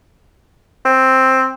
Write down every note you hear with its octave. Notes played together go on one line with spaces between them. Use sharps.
C4